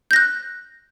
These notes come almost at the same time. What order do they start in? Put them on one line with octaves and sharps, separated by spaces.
G6 A#6 F#6